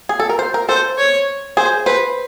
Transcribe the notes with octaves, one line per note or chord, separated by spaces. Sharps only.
G#4
A4
A#4
C5
A#4
A4 C5
C#5
G#4 C5
B4 C5